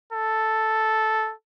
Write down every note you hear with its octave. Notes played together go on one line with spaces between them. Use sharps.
A4